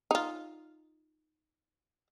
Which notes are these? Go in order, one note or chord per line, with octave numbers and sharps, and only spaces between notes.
D#4 F4